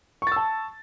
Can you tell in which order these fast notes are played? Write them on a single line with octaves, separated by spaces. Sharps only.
C#6 A6 E6 A5